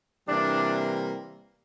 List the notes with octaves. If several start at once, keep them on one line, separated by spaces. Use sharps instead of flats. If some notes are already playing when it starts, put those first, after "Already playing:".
C3 E3 G3 A#3 D4